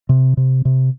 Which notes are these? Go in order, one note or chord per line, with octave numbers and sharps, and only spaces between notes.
C3
C3
C3